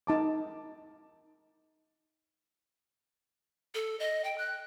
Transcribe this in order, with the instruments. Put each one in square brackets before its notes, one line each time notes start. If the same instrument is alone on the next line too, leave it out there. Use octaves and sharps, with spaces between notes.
[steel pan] D#4 A5 D6
[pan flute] A4
D#5
G5
F#6